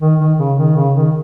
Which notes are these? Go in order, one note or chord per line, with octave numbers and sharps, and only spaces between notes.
D#3
D#3
C#3
D#3
C#3
D#3